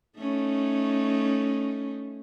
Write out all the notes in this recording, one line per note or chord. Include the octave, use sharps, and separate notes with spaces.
A3 C#4 D#4